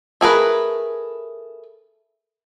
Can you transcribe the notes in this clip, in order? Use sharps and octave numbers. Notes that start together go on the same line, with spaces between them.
A3 G#4 A#4 B4